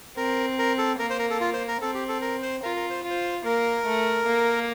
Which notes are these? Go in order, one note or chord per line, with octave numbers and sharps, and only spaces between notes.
C4 A#4
A#4
A4
A#3 A#4
C5
A#4
A4
F4
C5
A#4
C4 A4
G4
A4
A#4
C5
F4 A#4
A#4
C5
F4
C5
A#3 A#4
A3
A#3